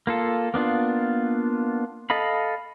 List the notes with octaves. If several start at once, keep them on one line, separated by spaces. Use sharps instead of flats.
A#3 F4 A4
A#3 B3 D4 F4
A4 D#5 F5 B5